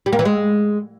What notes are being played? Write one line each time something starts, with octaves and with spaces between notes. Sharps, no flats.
G3
A#3
E3
G#3